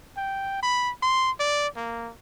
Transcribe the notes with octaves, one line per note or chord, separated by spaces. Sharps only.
G5
B5
C6
D5
A#3